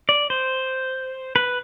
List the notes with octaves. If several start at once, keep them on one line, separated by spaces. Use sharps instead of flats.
D5
C5
B4